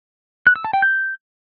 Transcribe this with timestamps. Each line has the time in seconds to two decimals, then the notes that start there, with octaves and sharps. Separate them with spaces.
0.47 F#6
0.56 E6
0.65 A5
0.73 G5
0.82 G6